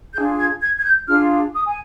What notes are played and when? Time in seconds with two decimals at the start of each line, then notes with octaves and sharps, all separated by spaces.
0.15 D4 F4 G#4 G6
0.39 G#6
0.61 G#6
0.78 G#6
0.85 G6
1.08 D4 F4 G#4 F6
1.54 D#6
1.66 G#5